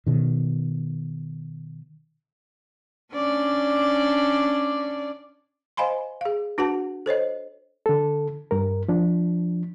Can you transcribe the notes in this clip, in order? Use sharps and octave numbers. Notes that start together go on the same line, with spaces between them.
B2 D#3
C#4 D4 D5
C5 D#5 F5 G#5 B5 C6
G#4 F5
D4 F#4 B4 F#5 A5
A4 C5 C#5 D#5
D3 A4
G2 A#4
F3 D4